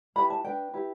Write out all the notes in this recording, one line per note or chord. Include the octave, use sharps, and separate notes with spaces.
E4 G4 B4 B5
A5
D4 B4 G5
E4 G4 B4